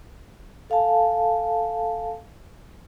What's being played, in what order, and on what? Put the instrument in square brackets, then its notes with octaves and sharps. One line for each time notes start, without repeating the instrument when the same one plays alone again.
[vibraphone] A4 F5 G#5 A5